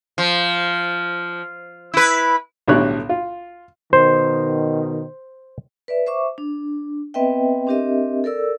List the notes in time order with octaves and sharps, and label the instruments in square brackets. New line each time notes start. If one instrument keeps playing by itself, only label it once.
[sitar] F3
E4 B4
[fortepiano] B1 A2 D3 G3 C#5 F#6
F4
[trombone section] B2 D#3 [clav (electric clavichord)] C5
[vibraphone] B4 D5 E5
C5 E5 C#6 D6
D4
B3 C4 B4 D#5 E5 G5
C4 D4 G4 A#4 D#5 E5
A4 A#4 D5 E6